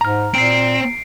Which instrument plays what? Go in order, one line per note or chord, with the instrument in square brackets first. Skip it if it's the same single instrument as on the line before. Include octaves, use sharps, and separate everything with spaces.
[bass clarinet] G#2 [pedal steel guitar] A#5 F6
[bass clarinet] A#2 [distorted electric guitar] C4 [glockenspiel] C7 D7